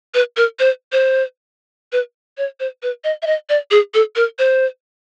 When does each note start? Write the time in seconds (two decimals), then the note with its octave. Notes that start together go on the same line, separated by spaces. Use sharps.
0.14 B4
0.37 A#4
0.59 C5
0.92 C5
1.92 B4
2.38 C#5
2.60 C5
2.83 B4
3.04 D#5
3.22 E5
3.27 D#5
3.49 D5
3.71 G#4
3.94 A4
4.16 A#4
4.39 C5